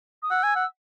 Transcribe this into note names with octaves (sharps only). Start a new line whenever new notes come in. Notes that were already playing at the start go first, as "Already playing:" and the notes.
D#6
F#5 E6
G#5
F#5